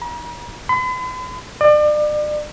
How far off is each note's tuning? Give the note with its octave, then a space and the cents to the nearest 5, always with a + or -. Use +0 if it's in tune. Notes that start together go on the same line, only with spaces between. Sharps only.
A#5 +45
B5 +45
D5 +35